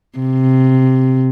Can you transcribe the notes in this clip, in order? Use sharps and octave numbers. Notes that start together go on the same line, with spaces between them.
C3